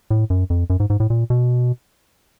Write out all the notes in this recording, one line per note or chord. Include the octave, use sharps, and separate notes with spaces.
A2
F#2
F2
F#2
G#2
G#2
A2
A#2
B2